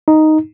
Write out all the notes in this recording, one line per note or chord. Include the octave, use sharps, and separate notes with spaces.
D#4